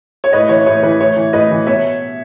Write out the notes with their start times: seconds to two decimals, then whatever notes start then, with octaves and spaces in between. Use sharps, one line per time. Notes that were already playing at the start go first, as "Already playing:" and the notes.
0.24 C#5
0.32 A2 B4 D#5
0.49 E3 C#5
0.66 A2 C#5
0.83 E3 B4
0.99 A2 C#5
1.16 E3
1.33 A2 B4 D#5
1.51 E3
1.66 B2 C#5 E5